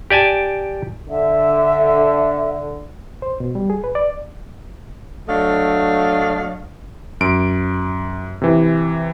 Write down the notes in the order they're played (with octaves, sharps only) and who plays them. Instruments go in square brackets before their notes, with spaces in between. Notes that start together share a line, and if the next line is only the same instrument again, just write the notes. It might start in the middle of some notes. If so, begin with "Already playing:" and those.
[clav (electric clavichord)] G4 D5 G#5 A5
[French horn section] D3 [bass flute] E5
[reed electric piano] C5
B2
G3
G#4
B4
D5
[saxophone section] F#3 A3 D4 D#5 F5
[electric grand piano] F#2 D7
C3 E3